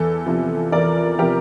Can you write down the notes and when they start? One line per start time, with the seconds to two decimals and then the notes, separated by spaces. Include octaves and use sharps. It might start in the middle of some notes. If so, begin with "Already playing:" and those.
Already playing: E2 A4
0.26 C3 F3
0.72 E2 A#4 D5
1.18 C3 F3 G4 A#4